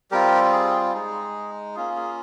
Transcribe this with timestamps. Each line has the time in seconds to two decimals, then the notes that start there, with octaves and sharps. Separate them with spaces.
0.11 G3 C4 F4 G4 A#4
0.52 G#4
0.94 G#3 D#4 G#4
1.75 A#3 C#4 F4 G#4
1.96 G#4